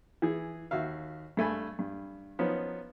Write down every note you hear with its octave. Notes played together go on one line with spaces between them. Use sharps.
E3 G#4
D#2 F#4 E5 F5
G2 A3 G#5 B5
G2
F3 F#3 B3 C#4 D#4